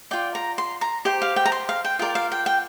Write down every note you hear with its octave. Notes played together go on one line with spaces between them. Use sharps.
F4 D5 G5
A#5
C6
A#5
G4 C5 G5
F5
G5
A#5
C6
F5
G5
F4 A#4 D5 G5
F5
G5
G5